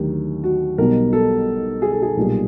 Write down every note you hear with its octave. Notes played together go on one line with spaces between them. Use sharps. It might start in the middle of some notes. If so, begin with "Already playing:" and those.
Already playing: D#2 D3 F#3 A3 G4
F#4
B1 B2 G3 A#4
A4
G#4
A4
G#4
B1 A#2 G3